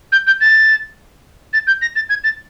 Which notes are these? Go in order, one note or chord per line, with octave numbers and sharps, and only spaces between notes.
G6
G6
A6
A6
G6
A#6
A6
G#6
A6